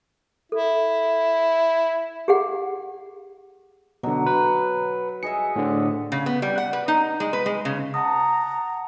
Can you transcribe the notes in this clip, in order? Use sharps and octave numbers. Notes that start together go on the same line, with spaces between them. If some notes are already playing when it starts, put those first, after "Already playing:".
E4 A4
G4 G#4 F#5
B2 D3 F#3
B4
G#4 D#5 E5 C#7
A2 D3
C#3
B3
G3
F#5
B4
D#4
G#3
B4
G#3
C#3
F#5 A5 A#5 D#6